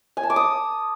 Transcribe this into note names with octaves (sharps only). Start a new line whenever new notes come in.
G#5
A5
D6
D#6